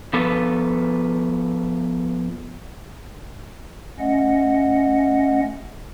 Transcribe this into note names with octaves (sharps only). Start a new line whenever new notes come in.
F3 B3 A4 B4
A3 C#4 D#5 F#5